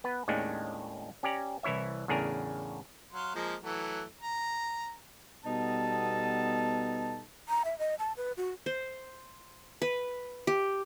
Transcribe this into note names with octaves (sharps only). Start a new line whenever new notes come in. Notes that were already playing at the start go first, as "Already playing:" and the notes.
B3 B4
D#2 A2 D#3 G#3 C#4 D4
C#4 G4 D5 A#5
C2 E3 E4 C#5 E5
E2 A2 C#3 D4 G#4 A#4
F#3 F5 C6
F3 G#3 A#3
E3 F#3 A3
A#5
B2 G3 B3 D#4 A4 A5
A#5
E5
D#5
A5
B4
F#4
C5
B4
G4